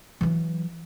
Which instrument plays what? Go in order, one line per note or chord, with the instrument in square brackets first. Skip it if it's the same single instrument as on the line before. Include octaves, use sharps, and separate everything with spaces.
[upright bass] E3 F#3